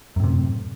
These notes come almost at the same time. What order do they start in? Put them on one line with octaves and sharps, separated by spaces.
F#2 A2 C3